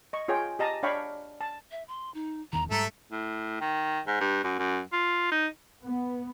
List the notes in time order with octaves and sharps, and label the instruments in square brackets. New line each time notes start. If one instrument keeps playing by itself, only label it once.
[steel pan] D#5 C#6
F4 G#4 C#5 G5
G4 D#5 A5 A#5 D#6
D4 C#5 F5 G5 B5 C#6
A5
[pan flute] E5
C6
D#4
[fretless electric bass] D#1 E2 D#3 [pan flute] A#5
[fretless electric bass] G#2 G3 [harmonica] A3 A4 E5 [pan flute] A#5
[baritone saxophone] A2
D#3
G#2
G2
F#2
F#2
F4
D#4
[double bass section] B3